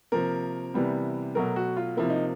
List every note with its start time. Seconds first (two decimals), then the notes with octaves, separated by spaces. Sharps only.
0.12 C3 F3 A#3 A#4
0.74 C3 E3 G3 B3
1.35 B2 F#3 A3 A#4
1.56 F#4
1.77 F4
1.97 C3 F3 A#3 E4
2.10 D#4